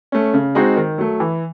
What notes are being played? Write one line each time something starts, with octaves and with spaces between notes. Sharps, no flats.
A3 C#4
C#3
G#3 C4 D#4 F#4
D#3
F#3 A3
E3